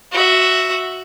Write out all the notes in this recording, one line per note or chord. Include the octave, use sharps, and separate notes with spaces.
F#4 E5